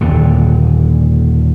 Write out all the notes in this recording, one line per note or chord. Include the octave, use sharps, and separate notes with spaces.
D#1 D#2 A#2 D3